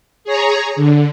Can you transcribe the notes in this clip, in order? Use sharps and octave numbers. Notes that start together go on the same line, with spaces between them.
G#4 C#5 A#5
D3